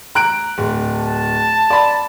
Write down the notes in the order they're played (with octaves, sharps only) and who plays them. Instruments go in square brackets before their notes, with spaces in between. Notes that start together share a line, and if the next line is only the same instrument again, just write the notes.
[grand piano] A#5 F#6 D7
D1
[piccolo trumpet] A5
[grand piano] D5 B5